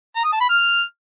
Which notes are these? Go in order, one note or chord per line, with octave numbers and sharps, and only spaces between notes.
A#5
D#6
A5
B5
F6